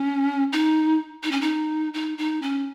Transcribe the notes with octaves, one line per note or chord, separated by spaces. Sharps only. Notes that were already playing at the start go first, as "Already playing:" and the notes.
Already playing: C#4
D#4
D#4
C#4
D#4
D#4
D#4
C#4